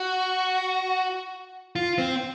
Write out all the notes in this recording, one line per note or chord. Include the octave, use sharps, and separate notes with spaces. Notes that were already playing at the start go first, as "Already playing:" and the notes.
Already playing: F#4
F4
C4